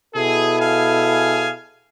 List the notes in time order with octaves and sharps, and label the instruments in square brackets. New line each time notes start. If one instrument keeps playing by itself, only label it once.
[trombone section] B2 E4 A4 [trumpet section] G#4
[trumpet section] G#4 F5 G#5